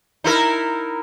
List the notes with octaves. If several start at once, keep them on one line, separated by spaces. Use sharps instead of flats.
D#4 E4 A#4